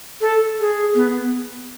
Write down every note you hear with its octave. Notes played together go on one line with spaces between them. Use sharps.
A4
G#4
B3